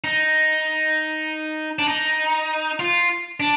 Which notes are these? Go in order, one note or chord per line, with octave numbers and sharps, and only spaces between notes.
D#4
D4
D#4
F4
D4